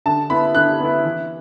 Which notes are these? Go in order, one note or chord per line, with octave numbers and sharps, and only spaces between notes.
D3 A5
B3 E4 B5
D3 F#6
B3 E4
E3